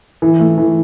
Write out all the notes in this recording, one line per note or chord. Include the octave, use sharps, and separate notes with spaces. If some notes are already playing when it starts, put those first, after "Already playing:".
E3
A3
E3